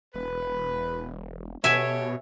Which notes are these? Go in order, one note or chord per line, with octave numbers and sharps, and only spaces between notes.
E1 B4
B2 G4 A4 C#5 E5 G#5